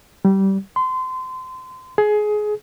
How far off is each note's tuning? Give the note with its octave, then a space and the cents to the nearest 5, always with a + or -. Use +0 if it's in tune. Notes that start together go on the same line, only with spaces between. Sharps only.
G3 -20
C6 -25
G#4 +20